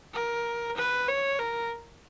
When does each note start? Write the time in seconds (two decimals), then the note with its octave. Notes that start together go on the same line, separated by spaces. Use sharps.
0.14 A#4
0.77 B4
1.08 C#5
1.39 A#4